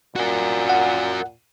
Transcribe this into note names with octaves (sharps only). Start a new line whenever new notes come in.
A#2 F#4 A#4
F#5